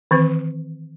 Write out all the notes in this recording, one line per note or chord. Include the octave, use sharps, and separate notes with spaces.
D#3 E3 C4